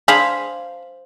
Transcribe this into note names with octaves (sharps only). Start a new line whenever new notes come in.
D4 G#4 C5 F5 B5